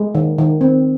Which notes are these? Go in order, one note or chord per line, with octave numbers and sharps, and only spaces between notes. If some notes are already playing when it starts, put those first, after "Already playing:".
Already playing: G#3
D#3
D#3
C4